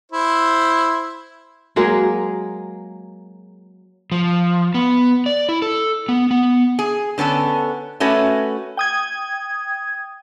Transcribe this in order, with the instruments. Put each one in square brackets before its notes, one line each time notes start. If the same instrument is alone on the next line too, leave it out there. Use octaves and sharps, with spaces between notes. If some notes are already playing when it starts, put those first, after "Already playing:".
[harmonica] E4 C5
[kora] F#3 G#3 A#3 G#4
[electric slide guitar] F3
B3
D5
E4
A4
B3
B3
[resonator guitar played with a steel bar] G#4
D3 B3 C#4 A4
A3 C#4 F#4 B4
[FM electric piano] G5 D#6 G#6